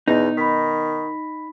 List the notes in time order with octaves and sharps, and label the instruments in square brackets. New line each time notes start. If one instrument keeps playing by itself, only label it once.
[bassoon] E2 [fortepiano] B2 [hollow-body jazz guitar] D#4
[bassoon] D#3 [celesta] B5 B6